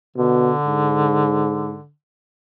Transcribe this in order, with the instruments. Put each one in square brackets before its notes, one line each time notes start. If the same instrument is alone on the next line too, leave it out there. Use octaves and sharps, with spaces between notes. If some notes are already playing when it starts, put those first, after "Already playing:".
[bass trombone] B2 [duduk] D3
[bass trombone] G#2